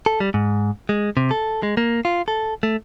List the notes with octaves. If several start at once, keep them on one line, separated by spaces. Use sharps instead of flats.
A4
G3
G#2
G#3
C3
A4
G#3
A#3
F4
A4
A3